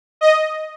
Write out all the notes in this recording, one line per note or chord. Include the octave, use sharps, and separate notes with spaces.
D#5